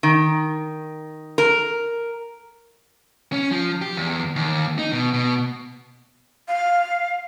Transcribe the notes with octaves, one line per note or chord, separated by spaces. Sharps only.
D#3
A#4
C#4
F3
G4
E2
D#2
D#4
B2
B2
F5